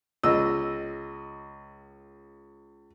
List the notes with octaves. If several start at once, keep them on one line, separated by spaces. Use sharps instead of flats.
C#2 D#5 E6